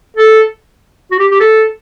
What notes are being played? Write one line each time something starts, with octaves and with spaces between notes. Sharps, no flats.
A4
F#4
G4
G4
A4